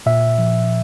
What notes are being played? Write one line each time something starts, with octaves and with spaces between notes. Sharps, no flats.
A#2 E5
F3